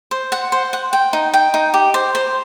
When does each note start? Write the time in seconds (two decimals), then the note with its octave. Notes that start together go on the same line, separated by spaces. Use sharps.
0.11 C5
0.32 F#5
0.52 C5
0.73 F#5
0.93 G5
1.13 D#4
1.34 G5
1.54 D#4
1.74 G4
1.94 C5
2.15 C5